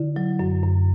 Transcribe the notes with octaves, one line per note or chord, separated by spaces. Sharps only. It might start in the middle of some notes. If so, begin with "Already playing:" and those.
Already playing: D3 E4
F#3
F#2
F#2